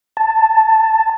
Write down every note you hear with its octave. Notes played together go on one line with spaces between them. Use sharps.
A5